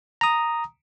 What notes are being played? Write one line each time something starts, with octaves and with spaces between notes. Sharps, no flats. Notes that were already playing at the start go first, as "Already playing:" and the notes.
A#5 D#6